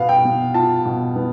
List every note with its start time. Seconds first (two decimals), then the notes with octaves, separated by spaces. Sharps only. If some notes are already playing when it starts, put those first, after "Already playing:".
Already playing: B2 B3 F5
0.09 G5
0.25 B2
0.54 F4 A5
0.85 B2
1.16 B3